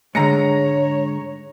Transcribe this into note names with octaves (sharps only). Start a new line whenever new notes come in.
G#2 D3 G#3 C#5 A#5 A#6 C#7